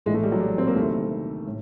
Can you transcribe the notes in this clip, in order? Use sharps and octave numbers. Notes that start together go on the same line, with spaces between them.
A#1 A2 E3 G#3
A3
G3
F#3
G3
C4
A#3
D2 C3 D#3 A3
A2